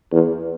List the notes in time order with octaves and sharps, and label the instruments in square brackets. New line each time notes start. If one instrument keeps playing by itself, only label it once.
[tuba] E2